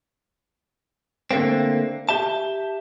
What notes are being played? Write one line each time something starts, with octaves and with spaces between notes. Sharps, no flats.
D3 A3 A#3 C4
G4 E5 A5